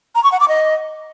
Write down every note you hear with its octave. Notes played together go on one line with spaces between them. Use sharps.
A#5
C#6
F#5
D6
D#5